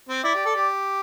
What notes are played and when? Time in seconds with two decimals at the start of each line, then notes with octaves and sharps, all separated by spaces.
0.09 C4
0.24 E4 D5
0.35 G4
0.45 A4
0.55 G4